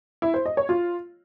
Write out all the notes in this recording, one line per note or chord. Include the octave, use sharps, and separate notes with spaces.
E4
C5
D#5
C#5
F4